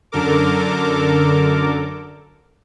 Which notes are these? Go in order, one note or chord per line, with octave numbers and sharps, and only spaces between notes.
F#2 D3 A4 A#4 D6